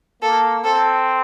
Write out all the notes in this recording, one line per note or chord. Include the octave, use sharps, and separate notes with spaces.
A#3 A4
C4 A4